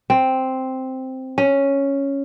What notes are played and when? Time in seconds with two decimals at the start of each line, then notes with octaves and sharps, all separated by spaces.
0.10 C4
1.38 C#4